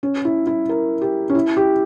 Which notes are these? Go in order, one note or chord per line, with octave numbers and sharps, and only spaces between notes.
C#4
E4
E4
A#4
G4
C#4
E4
G4